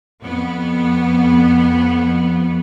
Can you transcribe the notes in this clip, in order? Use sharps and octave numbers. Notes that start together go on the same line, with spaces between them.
F2 B3